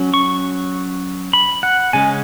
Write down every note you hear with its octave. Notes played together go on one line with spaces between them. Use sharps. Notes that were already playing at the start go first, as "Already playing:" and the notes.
Already playing: F#3 C#4
C#6
B5
F#5
C#3 G#3 C#4 G#5